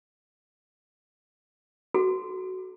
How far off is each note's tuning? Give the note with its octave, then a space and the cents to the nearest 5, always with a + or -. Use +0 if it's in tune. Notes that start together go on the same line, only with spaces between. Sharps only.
F#4 +10 A4 -30